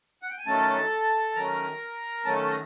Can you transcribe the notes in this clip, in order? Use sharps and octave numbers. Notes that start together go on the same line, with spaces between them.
F#5
G5
G#5
D#3 F#3 A3 C#4 A4 A5
D#3 F#3 A3 C#4 A#4 A#5
D#3 F#3 A3 C#4 A4 A5
A#5